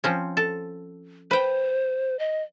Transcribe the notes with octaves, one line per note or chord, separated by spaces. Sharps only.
F3 C4 C#4
A4
B4 C5 G5
D#5